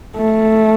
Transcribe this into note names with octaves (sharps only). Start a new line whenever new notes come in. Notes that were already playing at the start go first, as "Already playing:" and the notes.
A3